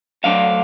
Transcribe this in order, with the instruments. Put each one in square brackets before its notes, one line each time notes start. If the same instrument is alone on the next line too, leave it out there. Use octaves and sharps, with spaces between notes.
[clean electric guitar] D2 D3 F#3 D4 F5